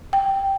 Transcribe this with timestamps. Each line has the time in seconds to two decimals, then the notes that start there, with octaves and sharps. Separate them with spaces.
0.13 G5